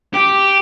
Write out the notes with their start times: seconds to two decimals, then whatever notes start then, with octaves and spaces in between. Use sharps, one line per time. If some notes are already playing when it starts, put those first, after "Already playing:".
0.14 G4